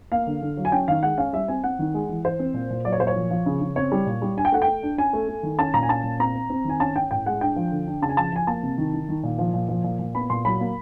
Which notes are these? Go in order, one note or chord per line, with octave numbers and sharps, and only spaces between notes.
A#3 F5
D3
D3
F#3
G#5
C#4 G5
D#3 F5
G#3 F#5
C#4 F5
G3 E5
C4 G#5
C4 F#5
D#3
G#3
E3
E3 C5
C4
A#2
A#2
F#3 D5
C#5
A#2 C5
C#5
F3
F3
C#3
C#3
C4 C#5
G3
A#2
G3
D4 G#5
G5
A3 F#5
G5
A3
D4
C#4 G#5
A3
A3
D#3
C#4 A5
A#2 A#5
G#5
C#4 A5
A#2
C4 A#5
C4
C4
D#3 G#5
C#4 A5
C#4 G5
A2 G5
G#3 F#5
D4 G5
F3
D3
D4
C#3 A5
G#5
F3 A5
F3 G#5
A#3 A5
C3
D#3
D#3
D#3
A#2
F3
A#2
F3
A#2
A#2
B3 B5
A#2 C6
F#3 B5
A#3